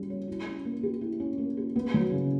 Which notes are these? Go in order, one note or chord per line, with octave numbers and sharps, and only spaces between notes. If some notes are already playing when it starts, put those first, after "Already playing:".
Already playing: G3 C#4 F#4
C#5
E4
C#4
A#3
G4
E4
C#4
A#3
G4
B3
F#3
C#3